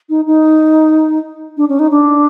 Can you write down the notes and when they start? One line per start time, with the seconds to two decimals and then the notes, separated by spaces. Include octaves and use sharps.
0.09 D#4
0.26 D#4
1.57 D4
1.69 C#4
1.79 D#4
1.91 D4